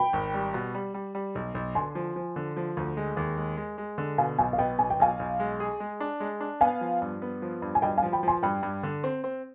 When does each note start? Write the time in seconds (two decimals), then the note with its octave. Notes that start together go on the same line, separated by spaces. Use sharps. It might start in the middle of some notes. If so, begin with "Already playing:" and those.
Already playing: G5 B5
0.13 G#1
0.34 G3
0.54 B2
0.74 G3
0.94 G3
1.15 G3
1.35 B1
1.55 B1
1.75 D3 G#5 C6
1.95 F3
2.16 F3
2.36 D3
2.57 F3
2.77 D2
2.97 G#3
3.17 D#2
3.37 G#3
3.57 G#3
3.78 G#3
3.98 D3
4.18 B2 F5 G#5
4.38 B1 F5 G#5
4.53 F5
4.58 B3 D#5 G5
4.79 B1 G#5
4.90 G5
5.00 B1 F5 G#5
5.19 B1
5.40 G#3
5.60 G#4
5.80 G#3
6.00 D4
6.20 G#3
6.41 D4
6.61 B3 F5 G#5
6.81 F3
7.02 G2
7.22 B3
7.42 F3
7.62 G2
7.75 G#5
7.82 G2 D#5 G5
7.97 F5 G#5
8.03 F3
8.13 G5 B5
8.23 F3 G#5 C6
8.43 G2 G5 B5
8.63 G2
8.83 D3
9.04 C4
9.24 C4